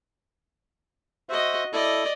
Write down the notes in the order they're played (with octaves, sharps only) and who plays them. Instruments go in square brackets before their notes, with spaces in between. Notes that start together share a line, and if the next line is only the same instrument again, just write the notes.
[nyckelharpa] F#4 D#5 [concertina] C5 E5
[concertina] E4 A4 [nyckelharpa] D5 D#5